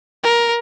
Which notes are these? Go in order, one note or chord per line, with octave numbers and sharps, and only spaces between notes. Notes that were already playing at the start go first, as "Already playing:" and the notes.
A#4